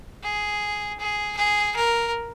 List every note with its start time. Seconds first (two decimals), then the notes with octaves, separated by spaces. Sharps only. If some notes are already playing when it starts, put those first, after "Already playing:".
0.23 G#4
0.99 G#4
1.37 G#4
1.76 A#4